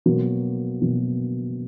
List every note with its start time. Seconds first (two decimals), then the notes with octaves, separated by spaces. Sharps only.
0.06 B2 F#3 A#3
0.81 B2 F#3 A#3